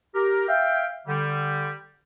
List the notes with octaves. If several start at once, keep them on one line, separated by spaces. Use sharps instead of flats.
G4 A#4
E5 F5 G5
D3 G3